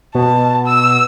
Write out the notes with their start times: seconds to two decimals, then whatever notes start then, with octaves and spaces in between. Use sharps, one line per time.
0.15 B2 A5
0.67 E6